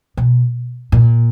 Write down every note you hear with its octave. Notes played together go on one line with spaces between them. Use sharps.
B2
A#2